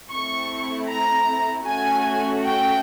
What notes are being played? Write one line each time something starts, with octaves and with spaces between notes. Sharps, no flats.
A3 C4 E4 C#6
A#5
A3 C#4 F#4 G#5
G5